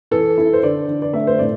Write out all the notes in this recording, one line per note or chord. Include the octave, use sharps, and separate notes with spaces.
E3 A4
E4
C5
D3 D5
D3
D5
A3 E5
C5
A2 D5